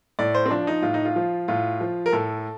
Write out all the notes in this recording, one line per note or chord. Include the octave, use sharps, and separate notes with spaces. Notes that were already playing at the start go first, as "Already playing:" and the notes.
A2 D5
C5
C4
F3 D4
D#4
A2 F4
D#4
F4
F3
A2 F4
F3
A#4
A2 A4